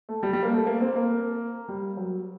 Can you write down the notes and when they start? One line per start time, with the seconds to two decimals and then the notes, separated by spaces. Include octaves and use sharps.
0.09 A3
0.23 G3
0.33 G3
0.43 A#3
0.52 A3
0.66 A#3
0.81 C4
0.96 A#3
1.68 G3
1.97 F#3